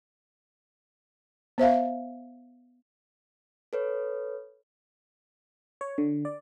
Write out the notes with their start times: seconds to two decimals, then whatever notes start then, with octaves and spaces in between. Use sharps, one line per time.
1.58 B3 C5 E5 F5
3.73 A4 B4 C#5
5.81 C#5
5.98 D3
6.25 D5